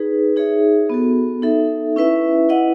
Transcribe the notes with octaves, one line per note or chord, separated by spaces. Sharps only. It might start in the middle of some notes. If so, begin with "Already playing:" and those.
Already playing: D#4 G#4 B4
D#4 G#4 C#5 E5
B3 F#4 A4
D#4 A4 E5
C#4 E4 B4 E5
E4 B4 D#5 F#5